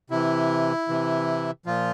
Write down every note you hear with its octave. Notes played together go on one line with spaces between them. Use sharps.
C3 E3 E4
C3 E3
A#2 F3 F4